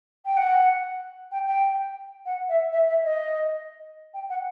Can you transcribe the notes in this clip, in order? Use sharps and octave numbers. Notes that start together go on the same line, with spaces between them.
G5
F#5
G5
G5
F#5
E5
E5
E5
D#5
G5
F#5